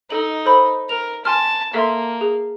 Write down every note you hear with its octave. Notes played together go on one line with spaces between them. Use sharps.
D#4 A4 F#7
A4 C5 B5
A#4 F7
G#5 A5 C6 F6
A#3 A4 E5 C6
G#4